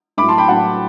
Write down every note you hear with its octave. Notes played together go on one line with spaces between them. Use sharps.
A2 B5 D6
F#3
A5 C6
G5 B5
A2 F#3 F#5 A5